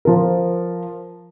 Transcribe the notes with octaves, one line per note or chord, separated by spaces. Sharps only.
F3 A#4